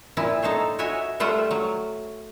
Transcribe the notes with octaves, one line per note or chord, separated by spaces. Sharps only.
A#2 F3 E4
D#4 A4 C5 C#5
F#4 C#5 D#5 E5 G#5
G3 A3 F4 C5 E5 F#5
F#3